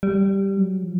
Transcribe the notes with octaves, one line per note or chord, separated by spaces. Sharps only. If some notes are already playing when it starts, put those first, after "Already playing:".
G3
F#3
F3